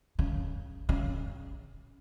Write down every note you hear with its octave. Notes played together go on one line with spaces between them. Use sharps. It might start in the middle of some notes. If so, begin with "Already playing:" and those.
C#3
C#3